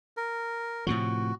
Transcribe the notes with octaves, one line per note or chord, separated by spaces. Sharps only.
A#4
A2 C3 F3 F#4